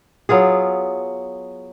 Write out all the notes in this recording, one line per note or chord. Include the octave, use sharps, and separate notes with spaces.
F#3 B3 F4 G#4